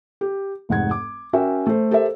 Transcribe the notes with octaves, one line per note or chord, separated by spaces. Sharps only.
G4
F1 G#2 F#5 G#6
D6
C#4 F#4 A#4 E5 G5
A3 C5
G4 A4 A#4 C5 E5